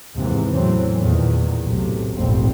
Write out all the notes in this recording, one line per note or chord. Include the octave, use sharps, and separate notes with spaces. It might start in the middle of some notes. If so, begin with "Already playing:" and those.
D#2 G#2 C3 E3
E2 A2 E3 F#3 C4
E2 A#2 D#3 E3
B1 A2 C3
F1 A#1 D#2 G#2 C4